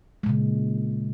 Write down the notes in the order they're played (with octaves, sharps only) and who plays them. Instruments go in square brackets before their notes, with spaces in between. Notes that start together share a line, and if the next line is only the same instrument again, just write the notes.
[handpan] G#3
A#2
C#3